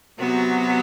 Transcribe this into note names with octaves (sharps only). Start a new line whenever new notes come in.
C3 F#3 B3 F#4